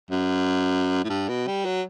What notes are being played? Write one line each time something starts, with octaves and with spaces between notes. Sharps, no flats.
F#2
A2
G2
B2
G3
F#3